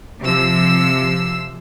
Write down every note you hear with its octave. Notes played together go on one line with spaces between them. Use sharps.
C3 F3 E6 C7